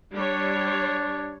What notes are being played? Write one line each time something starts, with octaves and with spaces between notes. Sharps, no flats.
G3 D4 C#5